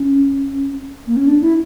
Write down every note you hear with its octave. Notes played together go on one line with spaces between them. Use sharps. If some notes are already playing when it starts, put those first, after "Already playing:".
Already playing: C#4
A#3
C#4
D4
E4